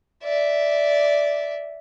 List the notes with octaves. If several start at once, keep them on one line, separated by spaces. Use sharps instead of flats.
D5 E5